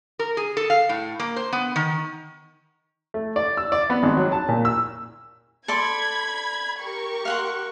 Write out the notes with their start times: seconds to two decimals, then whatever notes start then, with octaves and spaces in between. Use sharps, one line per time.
0.19 A#4
0.37 G#4
0.57 A4
0.70 F5
0.89 A2
1.20 A#3
1.36 C5
1.52 B3
1.76 D#3
3.14 A3
3.36 D5
3.57 E6
3.72 D5
3.90 B3
4.03 G#1
4.17 F#3
4.32 A5
4.48 A#2
4.65 E6
5.68 A4 D5 B5 C6 G#6
6.81 G4 A#4 C#6
7.25 F5 F#5 C6